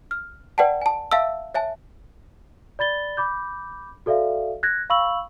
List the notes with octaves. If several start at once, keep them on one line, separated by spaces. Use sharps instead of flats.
F6
B4 D5 F#5 G5 A5
G#5 A5
E5 F5 A5 E6
C#5 E5 G#5 A5
D5 B5 A6 G7
B5 D6 G6
F#4 A4 D5 E5 F5
F#6 G#6 A#6
F5 B5 C#6 E6 F#7